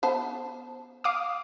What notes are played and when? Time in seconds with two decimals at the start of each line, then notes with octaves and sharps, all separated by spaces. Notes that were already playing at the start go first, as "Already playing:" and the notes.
0.03 B3 C5 A5
1.04 F5 D6 D#6